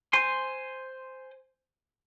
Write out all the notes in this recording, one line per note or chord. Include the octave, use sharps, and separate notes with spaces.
C5 G#5 C6